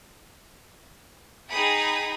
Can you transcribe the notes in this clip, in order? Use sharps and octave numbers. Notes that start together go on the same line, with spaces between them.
D#4 G#4 G5 B5 D#6